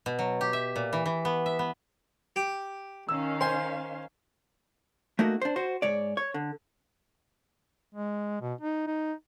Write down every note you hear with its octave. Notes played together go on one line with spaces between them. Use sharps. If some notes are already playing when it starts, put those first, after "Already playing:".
B2
F#3
G4
E5
A#2
E3
E3
B3
E5
B3
G4
D#3 C#4 F5 E6
C5 G#5 C6
A3 A#3 D#4 F#4
D4 C5
F#4 C5
G#2 C#5 D5
C#5
D3
G#3
B2
D#4
D#4